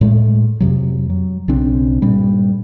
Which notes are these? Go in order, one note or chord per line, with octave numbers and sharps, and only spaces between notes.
A2 G#3 A3
F2 C3 F#3
F#3
B1 C#3 C4 D4
G2 A#2 G3